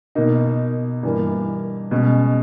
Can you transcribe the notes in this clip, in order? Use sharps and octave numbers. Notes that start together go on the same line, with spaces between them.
B2 A#3 D#4
G2 E3 A#3
B2 G#3 C#4